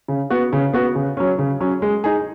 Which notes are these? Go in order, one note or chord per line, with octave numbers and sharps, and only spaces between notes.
C#3
B3 F#4
C#3
B3 F#4
C#3
F#3 C#4
C#3
F#3 C#4
G#3
D#4 G#4